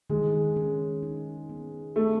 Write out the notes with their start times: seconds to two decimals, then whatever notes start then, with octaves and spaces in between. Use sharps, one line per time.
0.10 D#3 G#3
0.56 C#4
1.03 D#4
1.49 B3
1.96 A3 C4